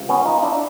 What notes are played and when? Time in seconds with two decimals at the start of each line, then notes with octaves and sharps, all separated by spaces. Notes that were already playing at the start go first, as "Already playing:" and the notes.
Already playing: C#2 C3 F3
0.09 B3 C#4
0.25 D#4 F4
0.42 D4 E4